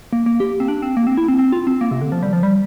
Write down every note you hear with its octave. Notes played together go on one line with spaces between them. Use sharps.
A#3
A#3
G4
C4
D4
C4
A#3
C4
E4
C4
C4
F4
C4
A#3
C3
D3
F3
G3
F3
G3